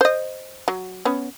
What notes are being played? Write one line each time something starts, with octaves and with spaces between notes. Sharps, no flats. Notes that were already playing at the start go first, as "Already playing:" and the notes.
C5 D#5
F#3
B3 C#4